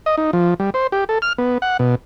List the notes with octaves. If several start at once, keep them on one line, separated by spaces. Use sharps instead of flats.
D#5
D#4
F3
G3
C5
G4
A4
F6
B3
F#5
B2